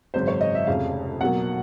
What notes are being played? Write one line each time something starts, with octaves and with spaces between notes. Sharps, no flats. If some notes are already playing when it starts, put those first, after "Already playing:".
G#1 F#2 C#3 C5
C#5
D#5
E5
F1 F2 C#3 F5
B1 B2 F#3 A#3 F#5